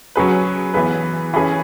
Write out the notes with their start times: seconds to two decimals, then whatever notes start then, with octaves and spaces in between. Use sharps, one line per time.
0.16 F#3 C#4 G#4 B4
0.74 E3 B3 G#4 B4
1.34 E3 C#4 G#4 B4